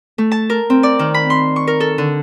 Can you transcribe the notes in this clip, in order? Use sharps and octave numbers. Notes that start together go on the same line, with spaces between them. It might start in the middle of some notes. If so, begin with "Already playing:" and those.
A3
A5
A#4
C4
D5
D#3
B5
C6
C#6
A#4
A4
D3